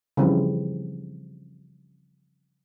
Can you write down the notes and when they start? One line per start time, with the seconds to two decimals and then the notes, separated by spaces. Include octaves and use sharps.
0.17 C#3 E3 F3 G3 C4 E4